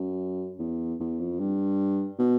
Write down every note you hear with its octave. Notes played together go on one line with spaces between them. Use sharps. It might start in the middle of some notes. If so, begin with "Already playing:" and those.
Already playing: F#2
E2
E2
F2
G2
B2